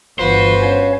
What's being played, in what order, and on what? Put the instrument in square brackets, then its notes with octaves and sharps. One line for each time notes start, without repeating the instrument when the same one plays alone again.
[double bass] G1 [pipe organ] E3 F4 F5 [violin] F#4 B4 [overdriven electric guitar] C5
[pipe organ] C#4 C#5 F5